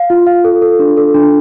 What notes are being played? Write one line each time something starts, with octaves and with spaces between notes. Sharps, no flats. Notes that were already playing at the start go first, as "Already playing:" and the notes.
Already playing: F5
F4
F5
A4
A4
D4
A4
D4